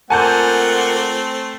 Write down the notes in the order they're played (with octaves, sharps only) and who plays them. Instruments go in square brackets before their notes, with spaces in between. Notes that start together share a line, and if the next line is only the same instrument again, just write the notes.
[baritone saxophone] A#2 [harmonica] A3 C4 [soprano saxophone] F#5 [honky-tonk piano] G#5 A5 G6